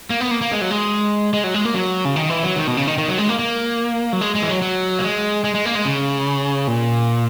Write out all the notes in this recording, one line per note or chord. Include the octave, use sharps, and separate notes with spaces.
A#3
B3
A#3
A#3
G#3
F#3
G#3
G#3
F#3
G#3
A#3
F#3
C#3
D#3
E3
F#3
D#3
B2
C#3
D#3
D#3
F#3
G#3
A#3
A#3
F#3
G#3
G#3
E3
F#3
F#3
A#3
G#3
G#3
G#3
A#3
G#3
C#3
A#2